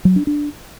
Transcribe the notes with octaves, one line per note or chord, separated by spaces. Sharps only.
F#3
D4
D4